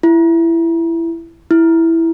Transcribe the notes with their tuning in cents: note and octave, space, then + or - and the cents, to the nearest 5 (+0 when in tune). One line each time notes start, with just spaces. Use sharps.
E4 +15
E4 +0